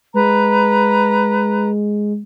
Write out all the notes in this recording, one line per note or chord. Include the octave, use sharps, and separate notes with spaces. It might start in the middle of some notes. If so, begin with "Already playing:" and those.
G#3 B4 A#5